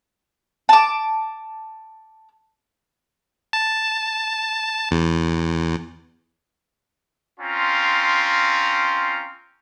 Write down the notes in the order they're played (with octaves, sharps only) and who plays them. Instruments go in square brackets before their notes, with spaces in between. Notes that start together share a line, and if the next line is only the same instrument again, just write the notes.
[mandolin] A5 D6
[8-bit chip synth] A5
E2
[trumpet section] C4 C#4 F4 A#5